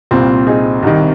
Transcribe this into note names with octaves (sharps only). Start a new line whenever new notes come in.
C2 A#2 C4 F4
D#4 G#4
C2 C3 D#3